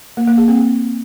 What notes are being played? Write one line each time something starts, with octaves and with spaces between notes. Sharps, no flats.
A#3
A#3
G#4
C4